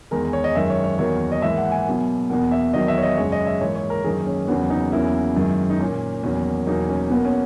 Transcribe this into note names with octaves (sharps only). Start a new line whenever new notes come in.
E2 D#3 G#3 A#4
C#5
D#5
F#2 D#3 G#3 E5
C#5
C#5
E2 D#3 F#3 A#3 C#5
D#5
G#2 E3 A#3 E5
F#5
G#5
B2 F#3 A#3
E2 B2 A#3 F#5
E5
E2 D#3 F#3 D#5
E5
C#5
D#5
F#2 C#3 G#3 C#5
D#5
E5
G#2 E3 A#3 C#5
C#5
A#4
F#2 D#3 A#3 G#4
C#4
E2 C#3 F#3 A#3 B3
D#4
E2 C#3 F#3 A#3 E4
F#2 D#3 G#3
D#4
A#2 A#3 C#4
E2 D#3 F#3 A#3 C#4
E2 B2 F#3 A#3 D#4
C#4
B2 A#3 B3
C#4